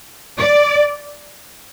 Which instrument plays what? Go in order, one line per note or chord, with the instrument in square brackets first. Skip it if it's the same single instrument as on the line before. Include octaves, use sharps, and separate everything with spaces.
[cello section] D5